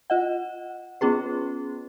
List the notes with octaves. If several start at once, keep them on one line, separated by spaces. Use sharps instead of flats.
F4 D#5 F#5
B3 C#4 F4 G#4 B4